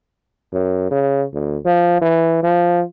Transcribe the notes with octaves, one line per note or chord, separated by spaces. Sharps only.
F#2
C#3
D2
F3
E3
F3